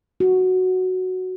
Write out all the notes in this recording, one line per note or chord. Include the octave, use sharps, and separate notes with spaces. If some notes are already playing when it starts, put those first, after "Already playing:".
F#4